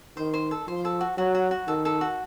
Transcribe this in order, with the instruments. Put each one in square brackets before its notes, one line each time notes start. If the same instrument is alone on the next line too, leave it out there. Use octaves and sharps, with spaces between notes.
[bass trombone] D#3 [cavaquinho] C5
[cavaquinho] C5
A4
[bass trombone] F3 [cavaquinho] C5
[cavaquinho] A4
F#4
[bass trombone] F#3 [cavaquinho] F#4
[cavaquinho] F#4
F#4
[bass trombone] D#3 [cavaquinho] A4
[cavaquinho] A4
F#4